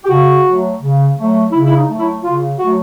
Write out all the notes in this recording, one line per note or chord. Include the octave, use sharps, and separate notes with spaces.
G4
C#3 F#4
F#3 A3
C#3
F#3 A3
C#3 E4
E4
D#4
F#3 A3
E4
C#3 F4
F#3 A3 F#4